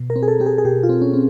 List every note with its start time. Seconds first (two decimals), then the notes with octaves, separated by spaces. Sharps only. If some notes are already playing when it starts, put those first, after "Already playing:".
Already playing: B2
0.10 A#4
0.16 C4
0.23 G#4
0.28 A4
0.40 C4 G4
0.46 G#4
0.58 G#4
0.65 B2 G4
0.83 F4
0.89 C4
1.02 C#4
1.13 C4